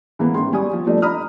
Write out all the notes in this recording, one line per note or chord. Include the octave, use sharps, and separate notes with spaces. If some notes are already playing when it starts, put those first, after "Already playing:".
E3 G#3 A#3 B3
A1 D#3 G#3 C6
G3 G#5 C#6 D#6
F3
F3 G3 A3 D4 D#5
D#5 A#5 B5 D#6 F6